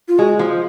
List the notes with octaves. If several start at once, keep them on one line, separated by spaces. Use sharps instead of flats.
F4
G#3 F#4
F3